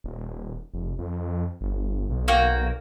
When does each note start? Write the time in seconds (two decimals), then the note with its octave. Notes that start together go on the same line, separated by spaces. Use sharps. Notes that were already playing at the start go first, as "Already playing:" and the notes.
0.04 D#1
0.74 F1
0.99 F2
1.61 G1
2.09 B1
2.28 A#3 F#4 G5